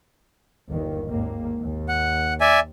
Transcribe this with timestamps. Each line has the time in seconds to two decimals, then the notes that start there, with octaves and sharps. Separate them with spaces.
0.69 G1 D#2 D#3
1.10 G#1 D#2 A#3
1.60 D#2
1.89 F#5
2.41 D5 E5 G#5